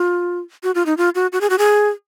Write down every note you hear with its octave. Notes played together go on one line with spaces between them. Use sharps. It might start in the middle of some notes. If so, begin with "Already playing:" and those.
Already playing: F4
F#4
F4
D#4
F4
F#4
F#4
G#4
F#4
G#4